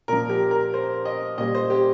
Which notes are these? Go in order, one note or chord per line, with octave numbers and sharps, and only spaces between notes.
A#2 F3 A#4
G4
A#4
C5
D#5
A#2 G3 D#5
C5
G4